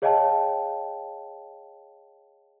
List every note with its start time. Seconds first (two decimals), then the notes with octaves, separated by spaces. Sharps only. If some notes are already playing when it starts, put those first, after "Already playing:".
0.02 G#4 C#5 D#5 F5 G5 A5